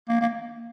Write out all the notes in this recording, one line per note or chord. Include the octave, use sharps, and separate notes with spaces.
A#3
A#3